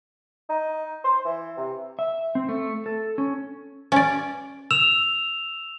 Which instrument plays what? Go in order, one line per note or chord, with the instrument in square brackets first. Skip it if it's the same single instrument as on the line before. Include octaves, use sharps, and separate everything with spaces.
[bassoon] D#4
C5
E3
C3
[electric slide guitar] E5
C4
A3
A4
C#4
[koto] C#4 D5
[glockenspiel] E6 E7 F7